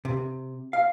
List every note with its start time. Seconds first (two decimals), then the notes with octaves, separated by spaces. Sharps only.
0.05 C3
0.73 F5